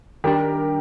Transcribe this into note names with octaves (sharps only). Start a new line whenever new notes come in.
D#3 G3 D4 G4 A#4